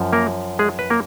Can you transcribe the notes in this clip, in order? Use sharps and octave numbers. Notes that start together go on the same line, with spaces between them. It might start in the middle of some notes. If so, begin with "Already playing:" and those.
Already playing: F#2 F3
A#3 A#4
G#3 G#4
B4
A#3 A#4